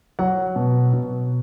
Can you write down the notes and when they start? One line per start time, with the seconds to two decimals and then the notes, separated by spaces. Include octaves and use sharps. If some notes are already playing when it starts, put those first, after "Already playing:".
0.19 F#3 F#5
0.56 B2
0.94 B2